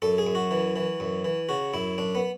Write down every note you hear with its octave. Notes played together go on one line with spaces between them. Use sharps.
F#2 A4
G#4
F#2
F#4
E3
E3
F#2
E3
C#3 F#4
F#2 E4
F#2 D4
B3